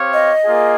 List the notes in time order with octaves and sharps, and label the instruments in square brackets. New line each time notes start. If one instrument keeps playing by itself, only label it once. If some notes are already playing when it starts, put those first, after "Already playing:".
Already playing: [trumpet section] C4 G4 C#5 F5
[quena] D#5
[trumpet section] A#3 F4 G#4